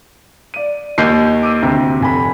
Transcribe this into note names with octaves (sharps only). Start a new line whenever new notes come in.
D5 D#7
D#2 G6 C7
D6 E6 D#7
D2 C3
F1 G#5 B5